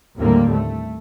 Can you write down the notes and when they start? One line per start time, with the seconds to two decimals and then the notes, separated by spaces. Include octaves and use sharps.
0.17 D#2 A2 D3 G3 A#3 C4
0.50 A3